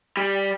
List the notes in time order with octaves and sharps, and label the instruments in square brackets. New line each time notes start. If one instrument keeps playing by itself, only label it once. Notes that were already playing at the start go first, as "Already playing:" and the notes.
[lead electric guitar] G3